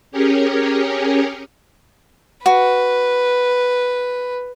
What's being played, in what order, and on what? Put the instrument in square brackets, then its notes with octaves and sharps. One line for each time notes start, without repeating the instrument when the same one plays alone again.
[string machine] C#4 G4 G#4 A#4 C#5
[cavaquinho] F#4 [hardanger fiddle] B4